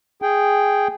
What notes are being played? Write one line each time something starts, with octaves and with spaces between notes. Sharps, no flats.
G#4 G5